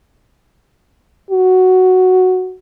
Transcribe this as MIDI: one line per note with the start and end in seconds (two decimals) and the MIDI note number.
1.31 2.56 66